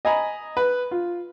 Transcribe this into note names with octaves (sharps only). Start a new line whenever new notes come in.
D#5 G#5 A#5 B5
B4
F4